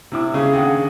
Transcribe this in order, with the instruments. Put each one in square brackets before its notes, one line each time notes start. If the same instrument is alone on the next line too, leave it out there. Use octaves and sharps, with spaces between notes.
[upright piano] C3 E4 D6
[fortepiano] C#3 [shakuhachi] G#4
[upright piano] D#2 D3 F#5